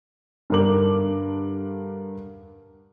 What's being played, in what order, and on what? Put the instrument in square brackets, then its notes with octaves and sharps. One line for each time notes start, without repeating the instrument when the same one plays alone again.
[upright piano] G2 D3 D4 A#4 D6 F#7